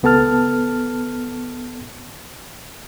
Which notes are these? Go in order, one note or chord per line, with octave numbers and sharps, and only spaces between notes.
C#2 B3 A4 A5 F6